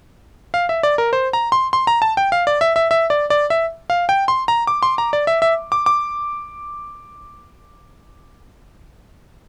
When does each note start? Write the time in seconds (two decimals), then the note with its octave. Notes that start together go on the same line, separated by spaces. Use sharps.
0.54 F5
0.69 E5
0.83 D5
0.98 A#4
1.13 C5
1.33 A#5
1.52 C6
1.73 C6
1.87 A#5
2.02 A5
2.17 G5
2.32 F5
2.47 D5
2.61 E5
2.76 E5
2.91 E5
3.10 D5
3.30 D5
3.50 E5
3.90 F5
4.09 G5
4.28 C6
4.48 A#5
4.67 D6
4.83 C6
4.98 A#5
5.13 D5
5.27 E5
5.42 E5
5.72 D6
5.86 D6